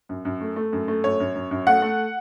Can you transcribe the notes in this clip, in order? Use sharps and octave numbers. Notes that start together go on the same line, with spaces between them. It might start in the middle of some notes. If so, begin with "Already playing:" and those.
F#2
F#2
A3
A3
F#2
A3
F#2 C#5
F#2
F#2
F#2
A3 F#5
A3